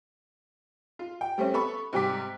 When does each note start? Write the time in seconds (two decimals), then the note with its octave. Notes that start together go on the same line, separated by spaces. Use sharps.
0.99 F4
1.21 G5
1.38 G3 A3 C4 C#4
1.53 B3 A4 B5 C#6
1.93 G#2 C3 G3 G5 D6 B6